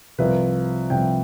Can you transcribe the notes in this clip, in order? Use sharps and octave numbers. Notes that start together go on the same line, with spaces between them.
C2 C3 F3 B4
C2 C3 F3 G5